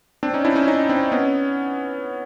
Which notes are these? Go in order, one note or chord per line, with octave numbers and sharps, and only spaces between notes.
C4 D4
C#4 D#4
D4 E4
C#4 D#4
C#4 D#4
C4 D4
B3 C#4